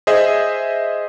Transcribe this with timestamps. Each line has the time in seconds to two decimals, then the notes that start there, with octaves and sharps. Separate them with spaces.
0.07 G#4 C5 D#5 E5